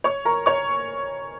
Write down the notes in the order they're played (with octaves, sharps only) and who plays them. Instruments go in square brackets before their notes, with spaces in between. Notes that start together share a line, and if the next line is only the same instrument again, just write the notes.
[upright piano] C#5 C#6
A#4 A#5
C#5 C#6